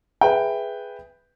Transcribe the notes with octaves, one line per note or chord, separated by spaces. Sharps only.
G#4 B4 E5 G5